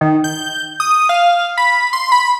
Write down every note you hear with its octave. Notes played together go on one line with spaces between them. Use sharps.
D#3
G6
D#6
F5
B5
C6
B5